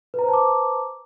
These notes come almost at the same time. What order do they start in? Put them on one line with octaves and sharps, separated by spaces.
B4 A#5 C5 A5 D6